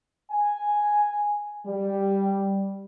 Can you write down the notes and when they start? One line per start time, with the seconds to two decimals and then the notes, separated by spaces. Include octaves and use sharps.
0.32 G#5
1.67 G3